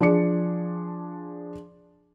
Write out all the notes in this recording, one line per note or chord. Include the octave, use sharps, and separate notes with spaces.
F3 D4 G#4 D5 C#7